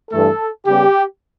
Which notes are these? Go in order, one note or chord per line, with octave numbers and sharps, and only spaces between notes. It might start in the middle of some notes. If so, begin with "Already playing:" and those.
G2 E3 A3 A4
C#3 G3 B3 G4